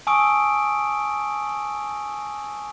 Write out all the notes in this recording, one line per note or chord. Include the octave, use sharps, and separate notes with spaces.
G#5 A5 C#6 D#6 E6 D7